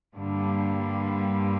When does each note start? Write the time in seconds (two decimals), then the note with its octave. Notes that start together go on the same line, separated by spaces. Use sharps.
0.15 G2 D3 G3 A#3